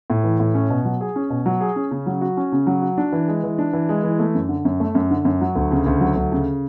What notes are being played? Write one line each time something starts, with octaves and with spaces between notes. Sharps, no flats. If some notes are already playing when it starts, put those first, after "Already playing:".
A2
E3
A2
C#4
B2
F#3
G#4
C#4
B2
F#3
G#4
C#4
C#3
F#3
F#4
C#4
C#3
F#3
F#4
D4
E3
G#3
E3
D4
E3
G#3
E3
A3
F#2
D3
F#2
A3
F#2
D3
F#2
F#3
D2
C#3
D2
F#3
D2
C#3